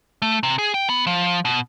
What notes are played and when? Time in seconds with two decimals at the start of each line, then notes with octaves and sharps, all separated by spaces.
0.22 A3
0.43 C3
0.58 G#4
0.74 G5
0.89 B3
1.07 F3
1.45 B2